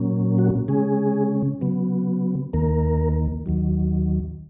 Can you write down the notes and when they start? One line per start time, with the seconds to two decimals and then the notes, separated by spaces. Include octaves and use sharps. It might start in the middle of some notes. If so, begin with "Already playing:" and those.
Already playing: A#2 F#3 A#3 C#4
0.38 F#4
0.68 C#3 G#3 C#4 G#4
1.61 C#3 F#3 B3
2.53 D#2 D#3 A#3 A#4
3.46 D#2 D#3 F#3